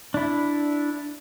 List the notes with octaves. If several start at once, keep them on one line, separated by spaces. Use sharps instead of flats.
D4 E4